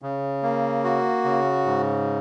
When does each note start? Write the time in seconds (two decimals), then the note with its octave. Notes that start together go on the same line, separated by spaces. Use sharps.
0.02 C#3
0.43 A#3
0.84 F#4
1.24 C#3
1.66 G#2